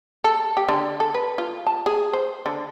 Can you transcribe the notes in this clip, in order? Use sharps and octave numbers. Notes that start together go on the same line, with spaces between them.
A4
G4
D3
A4
B4
F4
A5
G#4
C5
D3